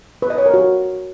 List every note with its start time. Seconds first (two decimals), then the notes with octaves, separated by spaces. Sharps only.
0.22 B4
0.30 D#5
0.38 C#5
0.46 A#4
0.54 F#4